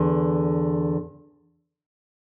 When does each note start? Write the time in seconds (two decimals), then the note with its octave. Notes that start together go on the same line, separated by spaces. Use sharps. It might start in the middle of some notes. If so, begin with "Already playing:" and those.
Already playing: E2 D3